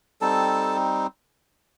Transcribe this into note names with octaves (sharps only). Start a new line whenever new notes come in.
G3 C4 D#4 A4 A5